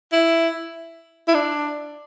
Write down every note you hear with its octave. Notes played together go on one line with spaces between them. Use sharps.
E4
E4
D4